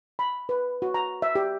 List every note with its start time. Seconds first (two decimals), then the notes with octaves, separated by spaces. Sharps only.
0.19 B5
0.49 B4
0.82 F#4
0.94 A#5
1.22 E5
1.35 G4